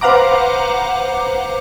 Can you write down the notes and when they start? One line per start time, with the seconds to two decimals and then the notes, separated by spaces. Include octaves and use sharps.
0.01 B4 C5 F5 F#5 A#5 D6